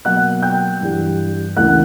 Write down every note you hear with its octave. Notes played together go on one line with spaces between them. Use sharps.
B2 F#3 A#3 F#5 F#6
G5 G6
G2 E3 G3
D2 C#3 E3 A#3 F#5 F#6